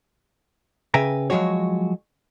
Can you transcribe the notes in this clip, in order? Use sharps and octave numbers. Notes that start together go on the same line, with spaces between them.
C#3 B4 E5 G5 G#5 A#5
F3 F#3 G#3 F#4 C#5